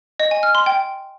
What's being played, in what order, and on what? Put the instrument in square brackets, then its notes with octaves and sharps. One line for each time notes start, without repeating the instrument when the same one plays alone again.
[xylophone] D#5
G#5
F6
C6
G5